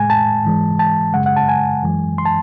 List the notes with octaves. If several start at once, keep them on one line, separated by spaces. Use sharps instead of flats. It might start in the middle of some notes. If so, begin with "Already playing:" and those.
Already playing: A2 G#3 G#5
A5
G#2 E3 G#3
A5
F#2 C#3 G#3 F#5
F#5
A5
G#5
F#2 E3 G#3
C6
A5